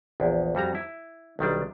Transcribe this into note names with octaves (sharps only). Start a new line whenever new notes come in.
A#1 E2
F2 G3 F#4 A#5
E4
B1 D#3 G3 D4